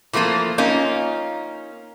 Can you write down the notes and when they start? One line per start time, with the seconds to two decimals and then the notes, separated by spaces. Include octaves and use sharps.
0.13 E3 F3 A3 A#3 F4
0.58 A#3 C#4 D#4 F4